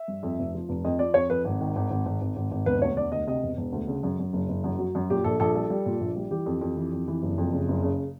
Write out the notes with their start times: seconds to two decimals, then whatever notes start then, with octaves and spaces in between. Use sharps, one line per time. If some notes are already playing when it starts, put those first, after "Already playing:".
Already playing: E5
0.08 G2
0.23 F2
0.39 F1
0.55 F3
0.69 F1
0.85 F2 D#5
0.99 F3 D5
1.14 F2 C#5
1.30 F2 B4
1.45 G#1
1.61 D#3
1.76 G#1
1.90 G#1
2.06 G#1
2.21 G#1
2.36 G#1
2.51 G#1
2.66 E1 B4
2.82 D2 C#5
2.96 E1 D5
3.12 D2 D#5
3.27 C3 D#5
3.43 E1
3.57 E1
3.72 D2
3.88 C#3
4.03 F#2
4.19 F#2
4.33 F#1
4.49 F#1
4.64 F#2
4.79 F#3
4.95 F#2
5.10 A#2 G4
5.24 A#1 A4
5.40 A#1 A4
5.55 G3 A4
5.70 G3
5.86 A#2
6.01 A#1
6.16 G3
6.31 E3 G4
6.46 F2
6.61 F2
6.77 E3
6.92 F2
7.08 E3
7.23 F#1
7.38 F2
7.53 C#3
7.68 F#1
7.83 C#3